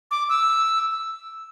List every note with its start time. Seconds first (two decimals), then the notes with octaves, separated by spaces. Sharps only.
0.11 D6
0.29 E6